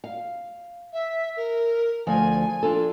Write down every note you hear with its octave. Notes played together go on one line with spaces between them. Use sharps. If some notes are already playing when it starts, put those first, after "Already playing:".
F5
E5
A#4
D2 F3 G#5
D4 F4 A4